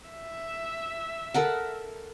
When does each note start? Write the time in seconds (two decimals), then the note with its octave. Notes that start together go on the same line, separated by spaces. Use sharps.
0.10 E5
1.34 A4 A#4 F#5